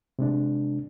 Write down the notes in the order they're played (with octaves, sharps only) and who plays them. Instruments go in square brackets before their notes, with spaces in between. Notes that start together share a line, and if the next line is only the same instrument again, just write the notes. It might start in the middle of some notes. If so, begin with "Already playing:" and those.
[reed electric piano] C3 G#3 D4